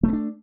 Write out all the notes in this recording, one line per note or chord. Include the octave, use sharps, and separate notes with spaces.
A3 B3 D4